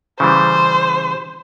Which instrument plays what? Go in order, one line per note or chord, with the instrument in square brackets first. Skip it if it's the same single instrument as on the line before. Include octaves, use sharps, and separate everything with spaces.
[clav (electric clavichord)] C#3 E3 G3 [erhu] C5